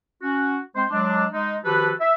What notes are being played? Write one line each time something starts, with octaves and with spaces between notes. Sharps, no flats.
C#4 F#4
G#3 C4 C5
F#3 G#3 D4
G#3 D#4
D#3 F3 F#4 G4 A4 B4
E5